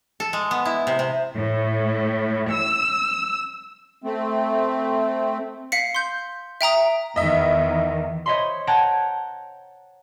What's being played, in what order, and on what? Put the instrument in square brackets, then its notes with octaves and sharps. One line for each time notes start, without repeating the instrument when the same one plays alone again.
[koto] A4
G#3
B3
E4
C3
C3
[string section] A2
E6
[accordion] A3 C4
[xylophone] F5 B6 C#7
C6 G6
E5 G5 A#5 D#6
[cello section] E2 D#3 [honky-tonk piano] D#5 E5
[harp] C5 C#5 D#5 E5 B5 C6
F#5 G5 A5 A#5 F#6 G#6